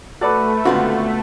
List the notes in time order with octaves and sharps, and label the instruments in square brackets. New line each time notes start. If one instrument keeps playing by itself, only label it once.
[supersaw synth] A3 [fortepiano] F#4 A4 D5 [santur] B4 A5
[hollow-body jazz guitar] C#2 B3 F#4 [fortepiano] D3 C4 F4